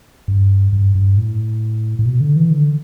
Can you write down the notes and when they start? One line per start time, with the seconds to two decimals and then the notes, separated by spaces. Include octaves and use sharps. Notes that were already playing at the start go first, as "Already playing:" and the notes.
0.28 G2
0.73 G2
0.95 G2
1.17 A2
1.99 A2
2.06 B2
2.20 D3
2.36 E3
2.50 D3